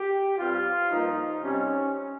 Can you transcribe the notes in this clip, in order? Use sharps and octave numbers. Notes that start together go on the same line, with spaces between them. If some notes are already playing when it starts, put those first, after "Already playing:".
Already playing: G4
G2 G3 C4 F4
G2 F3 A#3 D#4
C3 G3 C4 C#4